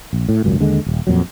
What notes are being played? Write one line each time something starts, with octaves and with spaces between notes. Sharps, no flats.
A#1
A2
G#1 C#2 F#2
D#2 D3 G#3
D#1
F2 A#2 F#3